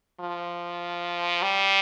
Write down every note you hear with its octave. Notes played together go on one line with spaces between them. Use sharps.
F3
G3